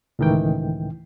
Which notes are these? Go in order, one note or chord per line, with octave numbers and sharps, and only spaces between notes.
C#2 A2 D#3 E3 G5